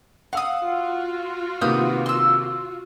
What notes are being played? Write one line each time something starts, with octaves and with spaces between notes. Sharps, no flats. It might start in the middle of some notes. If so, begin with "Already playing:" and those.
F5 F#5 D#6 E6
F4 F#4
C3 D#3 A#3 B3 D#6 G6
C6 E6